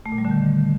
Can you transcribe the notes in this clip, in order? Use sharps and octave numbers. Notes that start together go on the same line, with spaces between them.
A3
A#2
G3
D3
D#3